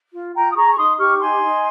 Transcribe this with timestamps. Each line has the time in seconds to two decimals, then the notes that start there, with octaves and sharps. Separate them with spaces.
0.13 F4
0.34 F4 G5 A#5
0.50 D#6
0.56 G#4 A#5 C#6
0.70 C#6
0.77 D#4 C6 D#6
0.98 G4 C#6 F6
1.19 D#4 G#5 C6
1.41 D#4